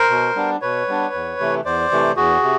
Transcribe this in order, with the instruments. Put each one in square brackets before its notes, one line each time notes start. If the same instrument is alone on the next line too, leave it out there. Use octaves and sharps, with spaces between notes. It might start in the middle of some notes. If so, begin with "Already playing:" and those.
Already playing: [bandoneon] A#4 C5
B2
G3 B3 D4
B2 B4 C#5
G3 B3 D4
E2
C3 E3 A3
E2 C5 D5
C3 E3 A3
E2 F#4 G#4
C3